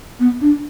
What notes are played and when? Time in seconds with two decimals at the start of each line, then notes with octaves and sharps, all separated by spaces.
0.19 B3
0.40 D4